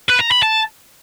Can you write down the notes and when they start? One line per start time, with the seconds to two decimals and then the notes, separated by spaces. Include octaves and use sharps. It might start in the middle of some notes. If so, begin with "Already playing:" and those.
0.10 B4
0.21 A#5
0.32 B5
0.43 A5